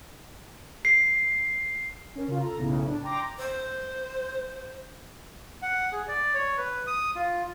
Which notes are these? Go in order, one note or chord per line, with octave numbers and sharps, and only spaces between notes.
C7
C#4 A#4
C#3 F4
A4 A#5
B1 A2 C#3
D4
G5 A#5 C6 D6 A#6
C5
F#5
G#4
D5
C#5
B4
D#6
F4